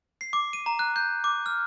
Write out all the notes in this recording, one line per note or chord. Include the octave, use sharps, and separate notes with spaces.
C7
D6
D#7
A#5
F#6
G6
D6
F6